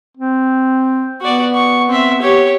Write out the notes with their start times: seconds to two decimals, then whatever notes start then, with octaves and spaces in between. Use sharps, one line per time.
0.17 C4
1.21 B3 F#4 D5
1.54 C#6
1.89 C4 E5
2.21 G4 C#5